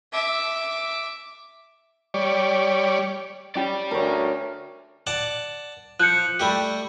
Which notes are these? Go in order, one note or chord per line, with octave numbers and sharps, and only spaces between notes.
E5 D6
G3 C#5 D5
C#4 G4 D5 G5
D2 A#4 C#5
D5 F#5 A5
F3 F#6 G6 C#7
G3 A3 G4